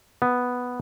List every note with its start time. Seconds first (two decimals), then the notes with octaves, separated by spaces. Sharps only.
0.22 B3